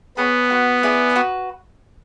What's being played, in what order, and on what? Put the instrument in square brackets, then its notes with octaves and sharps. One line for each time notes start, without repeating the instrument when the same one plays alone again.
[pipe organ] B3 [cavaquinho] G#4 C#5 F#5 B5
[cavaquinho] F#4 B4 F#5
E4 G#4 B4 D5
F#4 B4